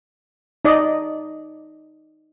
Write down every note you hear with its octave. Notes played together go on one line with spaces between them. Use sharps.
D#4 D5 D#5